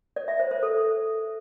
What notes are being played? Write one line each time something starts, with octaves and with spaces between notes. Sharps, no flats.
D5
E5
C5
C5
A4